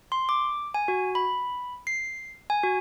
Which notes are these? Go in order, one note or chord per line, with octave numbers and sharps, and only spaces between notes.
C6
D6
G#5
F#4
B5
C7
G#5
F#4